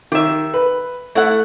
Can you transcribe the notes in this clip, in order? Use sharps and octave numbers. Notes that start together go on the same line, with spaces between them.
D#3 G4 E5
B4
A3 E4 F#5